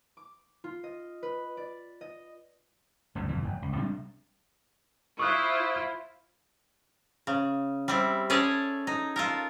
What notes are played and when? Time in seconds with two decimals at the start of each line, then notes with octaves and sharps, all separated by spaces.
0.17 D6
0.64 F4
0.84 D#5
1.23 B4
1.57 D5
2.01 D#5
3.15 G1 D2 G#2 C#3
3.28 F#1 F2 A#2 E3
3.42 F1
3.62 C#2
3.76 C3 G3 G#3 D4
5.19 E4 F4 C5 C#6 D#6 F#6
7.27 C#3
7.88 G3 C4 E4
8.30 C#4 G#4 A4 C#5 D5
8.87 D#4
9.16 F4 A4 A#4